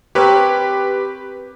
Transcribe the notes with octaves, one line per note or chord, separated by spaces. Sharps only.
C4 G4 A#4 B4 C#5